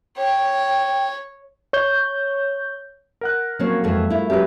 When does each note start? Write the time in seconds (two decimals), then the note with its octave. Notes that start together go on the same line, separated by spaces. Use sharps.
0.18 C#5 G5
1.73 C#5 G6
3.21 A#4 F#5 F#6
3.59 F3 F#3 A#3 C4 C#4 C#5
3.84 F2 E3 G#3 C4 A4
4.10 E4 F4
4.30 F#3 C#4 G4 B4